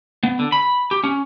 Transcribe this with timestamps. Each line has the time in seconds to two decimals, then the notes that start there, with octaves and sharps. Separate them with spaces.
0.23 B3
0.39 D3
0.52 B5
0.91 G4
1.04 C#4